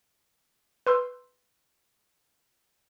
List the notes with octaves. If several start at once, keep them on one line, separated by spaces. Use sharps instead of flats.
B4 C6 E6 G6